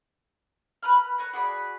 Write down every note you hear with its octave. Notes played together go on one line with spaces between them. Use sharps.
B4 A#5 B5 F6
B4 C#5 A#5
F#4 G#4 D5 B5